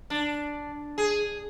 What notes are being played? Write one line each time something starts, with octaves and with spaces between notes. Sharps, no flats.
D4
G#4